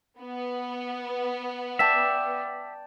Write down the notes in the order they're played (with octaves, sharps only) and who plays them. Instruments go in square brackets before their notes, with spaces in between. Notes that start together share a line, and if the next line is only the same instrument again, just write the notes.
[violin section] B3
[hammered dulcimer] D5 G5 A5 [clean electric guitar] E5